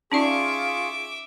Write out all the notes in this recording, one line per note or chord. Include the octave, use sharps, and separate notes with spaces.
C#4 D#4 F4 G#4 D5 E5 C#6 D6